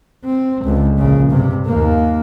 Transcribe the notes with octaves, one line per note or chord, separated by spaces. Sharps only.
C4
C#2 D3
A#1 C#3
G2 C3
D#2 A#3